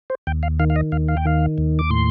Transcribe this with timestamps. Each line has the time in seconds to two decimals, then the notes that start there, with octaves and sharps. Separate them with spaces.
0.10 C5
0.27 D#2 G5
0.43 F5
0.60 D#3 F5
0.70 F5
0.76 D#5
0.92 D#2 F5
1.08 F5
1.17 G5
1.25 D#3 F5
1.58 D#2
1.79 D6
1.90 A2 C6